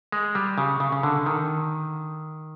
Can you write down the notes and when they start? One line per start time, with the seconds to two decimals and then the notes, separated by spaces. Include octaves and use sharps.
0.12 G#3
0.35 G3
0.58 C#3
0.80 C#3
0.92 C#3
1.03 D3
1.26 D#3